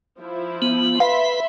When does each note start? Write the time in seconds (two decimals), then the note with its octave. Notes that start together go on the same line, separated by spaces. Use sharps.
0.19 F3 E4
0.62 B3
1.00 B4 E5 F5 B5 C6